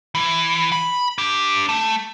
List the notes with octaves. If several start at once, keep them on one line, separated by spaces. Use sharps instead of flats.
E3
B5
D4 G4
A3